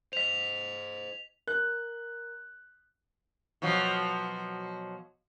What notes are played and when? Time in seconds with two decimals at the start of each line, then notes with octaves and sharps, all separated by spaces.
0.13 C5 D#5 B6 F7
1.47 A#4 F#6
3.62 B2 F3 F#3